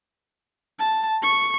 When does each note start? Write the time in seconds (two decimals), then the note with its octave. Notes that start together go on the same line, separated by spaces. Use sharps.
0.79 A5
1.23 C#6